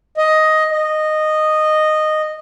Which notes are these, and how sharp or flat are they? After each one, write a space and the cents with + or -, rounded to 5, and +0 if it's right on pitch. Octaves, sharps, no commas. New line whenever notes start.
D#5 +10
D#5 -10